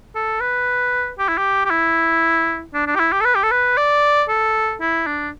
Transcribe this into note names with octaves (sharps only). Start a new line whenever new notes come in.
A4
B4
G4
E4
G4
G4
E4
D4
D4
G4
E4
G4
A4
B4
G4
A4
B4
D5
A4
E4
D4